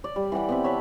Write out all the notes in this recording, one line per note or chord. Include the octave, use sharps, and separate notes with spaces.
D5
G3
E3 G4 F#5 G5
B3 C4 E5
C#5 E5 A5 B5